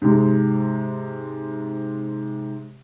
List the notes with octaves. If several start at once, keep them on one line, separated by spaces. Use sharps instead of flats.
G#2 C3 G#3